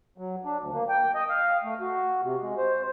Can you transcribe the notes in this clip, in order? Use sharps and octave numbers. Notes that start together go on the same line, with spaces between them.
F#3
D4
D2
A#3
G5
D#5
F5
A3
F#4
C3
G#3
C5